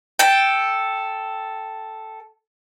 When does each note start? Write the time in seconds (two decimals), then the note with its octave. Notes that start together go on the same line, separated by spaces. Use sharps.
0.19 A4 G5